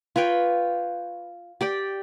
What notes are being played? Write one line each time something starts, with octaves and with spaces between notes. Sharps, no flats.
F4 B4 C#5 G5
G4 D5 G5